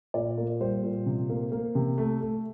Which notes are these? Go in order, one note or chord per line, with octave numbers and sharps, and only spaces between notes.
A#2 D5
A#3
G3 C5
A#2
C3
A#3
A#3
C3
A3
A3